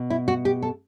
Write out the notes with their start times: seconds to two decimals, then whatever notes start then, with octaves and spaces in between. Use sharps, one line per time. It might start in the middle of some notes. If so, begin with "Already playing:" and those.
Already playing: B2
0.10 E4
0.28 F#4
0.45 G4
0.63 A4